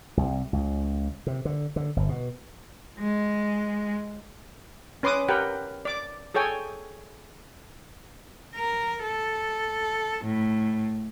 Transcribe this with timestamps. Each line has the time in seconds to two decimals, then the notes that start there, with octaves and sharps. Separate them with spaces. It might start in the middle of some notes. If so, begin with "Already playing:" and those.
0.17 C2
0.53 C#2
1.27 C3
1.45 D3
1.76 D3
1.96 G1
2.09 B2
2.99 G#3
5.03 C#4 B4 C6 D6 D#6
5.28 G4 A#4 B4 F#5 G5
5.85 D5 D6
6.34 G#4 A4 C#5 G5 G#5
8.56 A#4
9.04 A4
10.24 A2